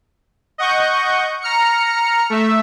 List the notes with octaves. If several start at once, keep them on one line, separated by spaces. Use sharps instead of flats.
D#5 F#5 C#6 G6
A#5 F6 C#7
A3 E5